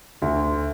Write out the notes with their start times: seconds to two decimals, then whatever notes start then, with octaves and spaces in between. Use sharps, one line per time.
0.22 D2